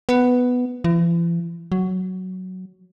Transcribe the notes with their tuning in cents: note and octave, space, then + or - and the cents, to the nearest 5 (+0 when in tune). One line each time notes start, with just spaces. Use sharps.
B3 +5
E3 +45
F#3 +5